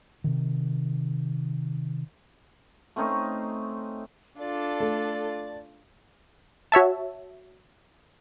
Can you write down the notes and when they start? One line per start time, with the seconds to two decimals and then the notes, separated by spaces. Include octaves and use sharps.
0.24 C3 D#3
2.96 A3 C4 C#4 D#4
4.39 D4 F4 A4 D5
4.80 A3
6.72 F#4 C#5 E5 A5